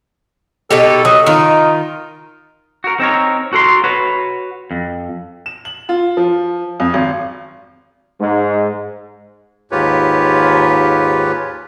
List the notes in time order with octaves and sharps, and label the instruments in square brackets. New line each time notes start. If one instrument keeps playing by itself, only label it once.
[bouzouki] B2 D#4 G4 [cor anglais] A4
[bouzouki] F#3 [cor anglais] D#5
[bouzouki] D#3 F4 [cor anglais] D#4
[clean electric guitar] F#4 A#4
C4 D#4 A4 A#4 C#5
F#4 A4 A#4 C6
F#4 B4 C#5
F2
[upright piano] E7
F#7
F4
F3
F2
G#1
[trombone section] G#2
[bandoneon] D#2 G#2 F4 G4 B4 C#5